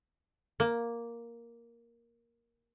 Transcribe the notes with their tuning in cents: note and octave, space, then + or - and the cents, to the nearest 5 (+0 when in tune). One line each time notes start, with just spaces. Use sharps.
A#3 +5